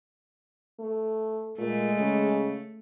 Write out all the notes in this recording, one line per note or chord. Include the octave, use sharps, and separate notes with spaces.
A3
A#2 G#3 A3
C#3